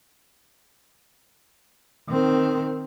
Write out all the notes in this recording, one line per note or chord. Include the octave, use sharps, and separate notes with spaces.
D#3 C4